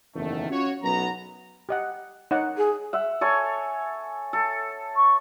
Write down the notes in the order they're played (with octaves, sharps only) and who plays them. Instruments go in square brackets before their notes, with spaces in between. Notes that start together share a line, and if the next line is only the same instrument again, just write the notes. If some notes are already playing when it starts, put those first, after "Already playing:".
[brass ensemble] F#1 E2 D#3 A3
C#4 F4 F#4 C#5
B1 F#2 B3 A#5
[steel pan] G4 D#5 F#5
D#4 C#5 F#5
[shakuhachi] G#4
[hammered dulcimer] E5 F#5
A4 C#5 G#5
A4
[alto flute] C#6